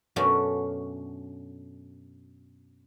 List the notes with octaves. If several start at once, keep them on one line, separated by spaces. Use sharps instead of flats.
F#2 B2 A3 C#4 D4 F#4